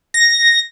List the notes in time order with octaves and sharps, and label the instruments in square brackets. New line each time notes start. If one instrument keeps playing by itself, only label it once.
[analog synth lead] A#6